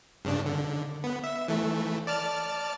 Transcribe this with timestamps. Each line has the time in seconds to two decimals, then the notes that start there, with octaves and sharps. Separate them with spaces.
0.25 G2 C#3 D4
0.46 D3
1.04 B3
1.24 E5
1.48 E3 A3
2.07 D5 A5 F6